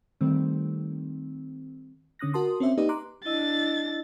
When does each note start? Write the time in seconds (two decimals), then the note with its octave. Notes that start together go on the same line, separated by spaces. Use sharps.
0.21 D#3 G3 A3 C4
2.19 D3 C#4 D#6 F#6 A#6
2.33 F#4 A#4 A5 C6 D#6
2.60 C4 C#4 C5 E5
2.77 A#3 D#4 G4 B4 D5 D#5
2.89 A#5 C6 D6 F#6
3.25 D4 E4 D#5 E6 A6